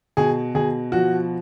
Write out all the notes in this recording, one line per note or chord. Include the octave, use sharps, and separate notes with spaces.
B2 G#4
B2 G#4
F3 F#4